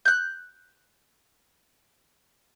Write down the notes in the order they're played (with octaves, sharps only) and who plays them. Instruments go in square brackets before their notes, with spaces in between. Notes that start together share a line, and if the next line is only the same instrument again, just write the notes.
[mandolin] F#6 G6